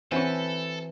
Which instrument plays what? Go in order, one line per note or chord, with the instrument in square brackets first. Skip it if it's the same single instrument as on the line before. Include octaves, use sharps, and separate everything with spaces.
[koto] E3 F#4 B4 [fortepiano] C4 C#4 [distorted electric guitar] A4